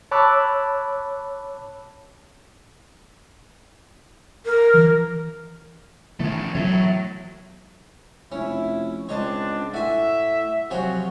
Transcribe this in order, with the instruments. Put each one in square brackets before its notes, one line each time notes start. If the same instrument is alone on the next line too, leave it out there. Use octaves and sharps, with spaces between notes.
[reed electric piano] C#5 A5 B5 D6 E6 F#6
[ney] A#4
[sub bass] E3
[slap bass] D#3 F3 B3 [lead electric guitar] A3 C#4
[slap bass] E3 A3 B3 [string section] F#3 [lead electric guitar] C#5 E5
[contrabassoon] F1 [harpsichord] C#4 [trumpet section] E4
[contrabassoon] C#2 [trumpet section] C4 D4 [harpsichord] C#5 D#5 A5
[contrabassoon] A2 [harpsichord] F#4 G#5 [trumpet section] E5
[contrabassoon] C3 [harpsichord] F3 F#3 G#4 [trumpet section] C4 F#4